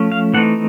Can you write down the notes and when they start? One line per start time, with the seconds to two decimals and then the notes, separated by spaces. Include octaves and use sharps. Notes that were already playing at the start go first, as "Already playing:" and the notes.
Already playing: F3 A3 C#4
0.12 F5
0.34 E3 A3 C4 D#4 F#5